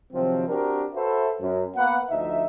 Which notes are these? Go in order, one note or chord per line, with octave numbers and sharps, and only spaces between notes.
C3 D#3 F3 F#3 C4
C4 D4 F#4 G4 A#4
F#4 A4 B4 C5 E5
F#2
A#3 B3 B4 F#5
D2 F3 D#4 E5